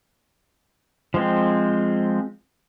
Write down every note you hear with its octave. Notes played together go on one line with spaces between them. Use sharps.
F3 G#3 C4